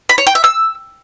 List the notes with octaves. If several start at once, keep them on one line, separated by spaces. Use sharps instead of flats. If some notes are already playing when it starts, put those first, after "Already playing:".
B5
C#5
G5
E5
E6